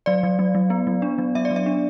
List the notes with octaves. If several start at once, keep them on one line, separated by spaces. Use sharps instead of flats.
F#3 D5
F#3
F#3
F#3
B3
F#3
D4
F#3
F#3 E5
D5
F#3
E5
D4